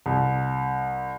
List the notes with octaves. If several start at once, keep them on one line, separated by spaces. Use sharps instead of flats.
C2